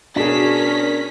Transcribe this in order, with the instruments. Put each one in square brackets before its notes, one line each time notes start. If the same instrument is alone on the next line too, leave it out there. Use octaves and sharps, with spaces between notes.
[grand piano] B2 G#4 [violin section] C#4 A#5 B6 [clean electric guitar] D4 [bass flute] A#4